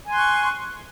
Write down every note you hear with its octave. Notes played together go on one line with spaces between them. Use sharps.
G#5 C6 C#6 F#6